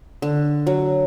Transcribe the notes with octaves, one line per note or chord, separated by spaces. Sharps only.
D3
F#3